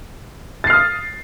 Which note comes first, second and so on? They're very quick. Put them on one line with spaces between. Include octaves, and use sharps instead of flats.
A6 C7 F6 D#6